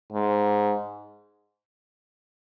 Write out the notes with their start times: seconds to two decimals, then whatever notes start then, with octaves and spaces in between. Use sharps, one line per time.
0.12 G#2